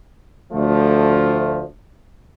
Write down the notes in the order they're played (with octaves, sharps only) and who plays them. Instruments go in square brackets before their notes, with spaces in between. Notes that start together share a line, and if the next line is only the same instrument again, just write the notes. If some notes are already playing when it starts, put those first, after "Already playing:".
[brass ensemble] D2 F3 A3